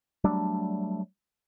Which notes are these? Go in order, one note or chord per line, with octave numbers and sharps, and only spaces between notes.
F#3 G3 A3 D4